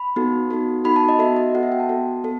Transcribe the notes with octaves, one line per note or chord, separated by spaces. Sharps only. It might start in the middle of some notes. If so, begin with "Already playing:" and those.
Already playing: B5
B3 D#4 F#4 A4
B3 D#4 F#4 A4
B3 D#4 F#4 A4 B5
A5
D#5
B3 F#4 A4 E5
D#5
B3 F#4 A4 F#5
E5
G5
A5
B3 F#4 A4
B3 A4